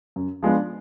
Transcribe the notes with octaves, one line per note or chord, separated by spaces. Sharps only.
F#2
F3 G#3 B3 D4